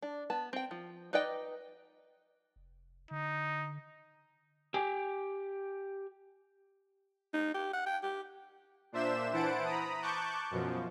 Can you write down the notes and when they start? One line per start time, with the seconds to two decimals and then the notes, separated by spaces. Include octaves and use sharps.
0.02 D4
0.30 B3 A5
0.53 C4 G5
0.71 F3
1.13 D#4 B4 D5 D#5 G5
2.56 F1
3.11 D3 D#4
4.74 G4 G#5
7.34 D#4
7.54 G4
7.73 F#5
7.86 G5
8.03 G4
8.92 A#2 D4 C5 E5 E7
9.33 E3 E4 C5 F#5 A5 D7
9.65 A#5 B5 D#6
10.02 A5 C#6 D6 F#6 G6
10.51 F#2 B2 F3